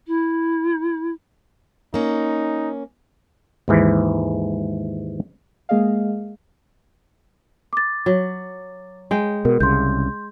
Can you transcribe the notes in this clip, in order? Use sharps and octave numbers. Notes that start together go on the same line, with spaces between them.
E4
A#3 C#4 D#4
D#2 G#2 E3
G#3 A#3 G#4 D#5 F5
D6 A6
F#3
G#3 G5
B2 A#4
C2 C#3 C6 G6